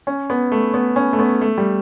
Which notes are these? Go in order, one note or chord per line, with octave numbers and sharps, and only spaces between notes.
C#4
B3
A3
B3
C#4
A3
B3
A3
G3